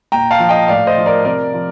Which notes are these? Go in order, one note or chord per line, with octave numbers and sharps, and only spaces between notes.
A#2 G5 A#5
F5 A5
F3
D#5 G5
A2 D5 F5
C5 D#5
F3
A#4 D5
C3 A#4 D5
F3